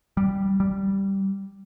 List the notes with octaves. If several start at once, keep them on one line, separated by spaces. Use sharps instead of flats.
G3
G3